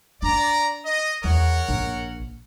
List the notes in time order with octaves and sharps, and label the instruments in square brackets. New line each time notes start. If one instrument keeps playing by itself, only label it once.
[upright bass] D4 [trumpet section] D5 A#5
[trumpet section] D#5
[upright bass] E2 E3 [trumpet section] A#4 C#5 F#5
[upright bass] A#1